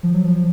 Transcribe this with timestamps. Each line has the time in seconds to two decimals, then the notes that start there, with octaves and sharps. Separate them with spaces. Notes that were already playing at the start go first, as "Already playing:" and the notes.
0.03 F3
0.14 F#3
0.25 F3